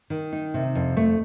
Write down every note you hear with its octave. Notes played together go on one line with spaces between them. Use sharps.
D#3
D#4
C3
F2
A3